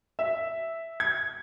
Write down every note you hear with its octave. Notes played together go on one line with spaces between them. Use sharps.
E5
G#6